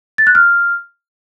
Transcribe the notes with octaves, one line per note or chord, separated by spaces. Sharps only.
A6
F#6
F6